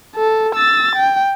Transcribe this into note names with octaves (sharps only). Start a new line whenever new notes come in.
A4
E6 A6
G5